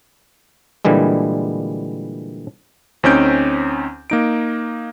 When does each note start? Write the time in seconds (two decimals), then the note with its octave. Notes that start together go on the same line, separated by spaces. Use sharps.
0.85 A#2 D3 E3 G3 G#3
3.03 D2 C4 C#4 D#4 G6 D7
4.10 A#3 D#4 D7